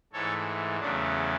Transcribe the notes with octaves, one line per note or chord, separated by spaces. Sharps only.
G#2 E3 A3 A4 C#5
E2 C#3 F#3 A3 D4